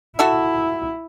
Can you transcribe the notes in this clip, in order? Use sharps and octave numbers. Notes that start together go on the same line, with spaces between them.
E4 F#4 A4 E5